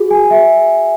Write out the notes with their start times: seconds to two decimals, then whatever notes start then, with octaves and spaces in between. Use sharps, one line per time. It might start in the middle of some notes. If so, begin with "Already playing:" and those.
Already playing: F#4 G#4
0.11 G#5
0.31 E5